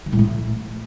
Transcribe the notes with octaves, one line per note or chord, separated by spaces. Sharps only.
D#3
A2
A3